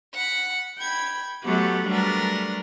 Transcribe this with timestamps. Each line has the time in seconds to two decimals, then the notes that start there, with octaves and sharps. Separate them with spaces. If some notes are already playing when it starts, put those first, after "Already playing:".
0.14 F#5 B5
0.80 G5 B5 G#6
1.44 F#3 A3 B3 G4 B4 F#5
1.87 F#3 G3 A3 D4 A#4 B4